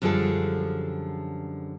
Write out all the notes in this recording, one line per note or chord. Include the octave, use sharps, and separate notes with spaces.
F#2 D3 F3 G3 G#4 A4